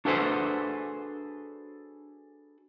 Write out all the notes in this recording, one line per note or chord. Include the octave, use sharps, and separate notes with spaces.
D4 F#4 G#4 A4 B4 C5